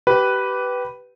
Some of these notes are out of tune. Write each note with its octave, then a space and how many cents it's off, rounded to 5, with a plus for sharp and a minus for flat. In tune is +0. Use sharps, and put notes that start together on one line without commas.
G4 -20 B4 +0